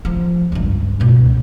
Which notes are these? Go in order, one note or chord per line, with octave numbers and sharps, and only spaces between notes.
F3
C#2 G2
C#2 B2